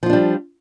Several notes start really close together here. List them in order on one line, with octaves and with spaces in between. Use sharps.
F3 F4 D4 G3